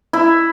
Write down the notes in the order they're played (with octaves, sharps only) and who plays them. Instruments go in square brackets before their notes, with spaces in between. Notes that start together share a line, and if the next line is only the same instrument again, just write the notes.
[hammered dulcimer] E4